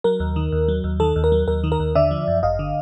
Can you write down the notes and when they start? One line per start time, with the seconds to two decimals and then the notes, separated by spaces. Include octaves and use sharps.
0.04 F#3 A#4
0.20 D#2
0.36 D#3
0.52 D#2
0.68 F#3
0.84 D#2
1.00 D#3 A4
1.16 D#2
1.24 A#4
1.32 F#3
1.48 D#2 A#4
1.64 D#3
1.72 A#4
1.80 D#2
1.95 D3 D5 E5
2.11 F3
2.28 F#2
2.43 G1 D#5 F5
2.59 D3